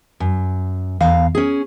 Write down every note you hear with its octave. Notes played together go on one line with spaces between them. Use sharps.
F#2
E2 F5
C#4 G#4